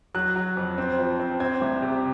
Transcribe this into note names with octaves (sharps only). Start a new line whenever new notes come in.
F#3 F#6
F#3
F2
C4
F3
C4
C4 G#6
C2
C3